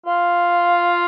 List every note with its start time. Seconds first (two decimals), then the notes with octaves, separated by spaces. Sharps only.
0.05 F4